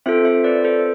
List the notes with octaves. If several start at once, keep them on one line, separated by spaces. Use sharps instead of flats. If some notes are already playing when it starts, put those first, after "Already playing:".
C4 F4 A4 C5 E5
C5 E5
B4 D5
A4 C5